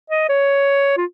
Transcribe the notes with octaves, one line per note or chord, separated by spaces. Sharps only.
D#5
C#5
F4